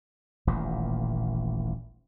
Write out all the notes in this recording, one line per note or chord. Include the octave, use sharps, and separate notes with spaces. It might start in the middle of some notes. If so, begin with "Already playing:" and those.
D#1 A1 D#2 A#2